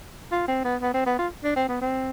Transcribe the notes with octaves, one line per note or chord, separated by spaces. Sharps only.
F4
C4
B3
B3
C4
B3
F4
D4
C4
B3
C4